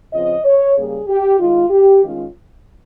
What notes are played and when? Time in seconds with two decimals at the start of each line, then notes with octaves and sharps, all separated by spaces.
0.13 C#3 F3 C4 F4 D#5
0.44 C#5
0.75 C#3 G3 A#3 G#4
1.08 G4
1.39 D#3 G#3 D#4 F4
1.70 G4
2.03 D#3 G#3 C#4 F4